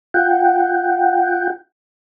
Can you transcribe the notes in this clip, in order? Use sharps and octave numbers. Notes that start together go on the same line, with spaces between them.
F4 F#5 G5